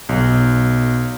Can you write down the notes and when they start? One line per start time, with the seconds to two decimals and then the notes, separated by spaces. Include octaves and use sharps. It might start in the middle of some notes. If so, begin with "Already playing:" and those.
0.09 B1